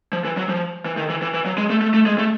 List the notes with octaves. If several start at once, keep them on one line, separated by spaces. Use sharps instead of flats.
F3
E3
F#3
F3
E3
D#3
E3
E3
E3
F#3
G#3
A3
A3
A3
G#3
A3